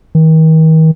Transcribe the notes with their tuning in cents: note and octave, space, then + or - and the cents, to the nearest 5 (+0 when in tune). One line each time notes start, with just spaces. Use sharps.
D#3 +40